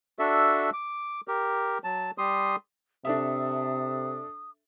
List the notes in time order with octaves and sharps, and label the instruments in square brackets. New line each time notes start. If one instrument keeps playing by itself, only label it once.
[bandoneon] D4 F#4 A4 E5
D6
G4 A#4
F#3 A5
G3 G4 C6 D#6
[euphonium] C3 [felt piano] D4 A4 E5 [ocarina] D#6